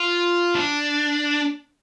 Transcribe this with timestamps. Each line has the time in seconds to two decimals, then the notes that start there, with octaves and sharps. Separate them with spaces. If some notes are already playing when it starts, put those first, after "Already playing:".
Already playing: F4
0.55 D4